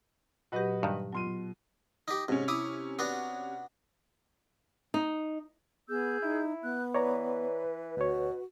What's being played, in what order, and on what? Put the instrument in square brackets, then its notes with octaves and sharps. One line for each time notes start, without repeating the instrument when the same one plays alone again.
[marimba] A#2 F#3 G4 [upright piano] F#4 B4 D#5
[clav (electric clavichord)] G2 D#3
[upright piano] B2 C6 D#7 [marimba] F#3 F4
[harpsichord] D#4 G4
[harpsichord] G#2 [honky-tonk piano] C3 C#4
[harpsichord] E4 D6 D#6
B3 D4 F#4
[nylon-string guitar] D#4
[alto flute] B3 [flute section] G#4 E6 G6
[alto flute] D#4 [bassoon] E4
[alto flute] B3 [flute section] F#6
[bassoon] E3 [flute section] B4 [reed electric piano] C#5 D5 A#5
[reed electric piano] D2 C#5 [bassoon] B2 [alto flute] F#4